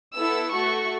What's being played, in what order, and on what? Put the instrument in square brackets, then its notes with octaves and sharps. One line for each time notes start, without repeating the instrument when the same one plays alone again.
[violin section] B3 E4 A4 E6
A3 F#4 A4 C#6